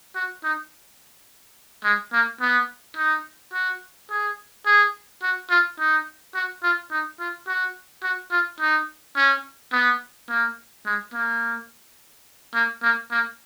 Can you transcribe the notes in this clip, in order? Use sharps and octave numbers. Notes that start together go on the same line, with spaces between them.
F#4
D#4
G#3
A#3
B3
D#4
F#4
G#4
G#4
F#4
F4
D#4
F#4
F4
D#4
F4
F#4
F#4
F4
D#4
C#4
B3
A#3
G#3
A#3
A#3
A#3
A#3